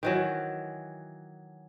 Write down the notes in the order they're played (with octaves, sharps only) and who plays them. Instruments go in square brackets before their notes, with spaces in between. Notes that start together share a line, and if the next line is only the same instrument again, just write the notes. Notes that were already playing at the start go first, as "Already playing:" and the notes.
[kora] D#3 E3 F#3